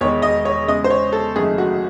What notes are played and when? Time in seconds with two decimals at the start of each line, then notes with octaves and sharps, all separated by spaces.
0.01 E1 E2 D#3 G#3 C#5
0.22 D#5
0.45 C#5
0.67 E2 C#3 G#3 D#5
0.84 C5
0.90 C#5
1.13 A4
1.36 F#1 F#2 D#3 A3 G#4
1.58 F#4